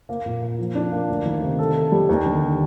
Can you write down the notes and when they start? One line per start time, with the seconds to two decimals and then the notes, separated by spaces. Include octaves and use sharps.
0.09 A#3
0.26 A#2
0.42 A#3
0.59 F3
0.75 D4
0.92 A#3
1.09 D2
1.26 D#3
1.42 C3
1.59 A4
1.75 A4
1.92 G3
2.09 D#2
2.26 D3